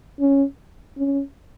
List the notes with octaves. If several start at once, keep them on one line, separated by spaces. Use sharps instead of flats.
C#4
C#4